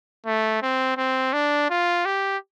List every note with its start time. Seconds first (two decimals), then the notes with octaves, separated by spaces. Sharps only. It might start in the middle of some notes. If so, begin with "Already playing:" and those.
0.26 A3
0.62 C4
0.97 C4
1.33 D4
1.70 F4
2.05 G4